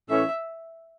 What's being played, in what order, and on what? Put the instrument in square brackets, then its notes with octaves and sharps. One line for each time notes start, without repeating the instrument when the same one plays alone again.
[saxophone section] A2 E3 A3 C#4 [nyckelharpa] E5